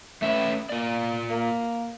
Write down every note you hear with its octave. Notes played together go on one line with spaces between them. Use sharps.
A3 C#4 B4 E5
A#3 F4 D5
A#3